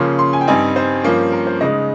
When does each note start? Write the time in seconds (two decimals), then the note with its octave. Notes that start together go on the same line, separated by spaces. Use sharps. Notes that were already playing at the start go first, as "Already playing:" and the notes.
Already playing: C#3 F3 A#3 C#4 C6
0.19 C6
0.33 G#5
0.41 G5
0.47 G2 G3 C4 D#4 G#5
0.76 C5
1.04 G2 F3 A#3 C#4
1.32 A#4
1.47 C5
1.61 C#3 G#3 D#4 D#5